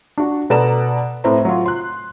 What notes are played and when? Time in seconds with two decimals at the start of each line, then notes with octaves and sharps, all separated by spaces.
0.18 D4 F#4
0.50 B2 A4 B4 D5 A#5 E7
1.24 A2 A3 C4 B4 A#5
1.45 F#3 F4
1.66 C6 F#6